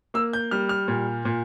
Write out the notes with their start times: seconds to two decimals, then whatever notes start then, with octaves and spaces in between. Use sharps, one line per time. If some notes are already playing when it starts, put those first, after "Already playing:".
0.14 A#3 E6
0.33 G6
0.51 G3 F6
0.69 F6
0.88 A#2
1.25 A#2